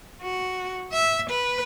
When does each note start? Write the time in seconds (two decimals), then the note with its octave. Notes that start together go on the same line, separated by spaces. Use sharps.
0.22 F#4
0.93 E5
1.30 B4